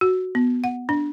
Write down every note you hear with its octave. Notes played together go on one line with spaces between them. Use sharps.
F#4
B3
F#5
D4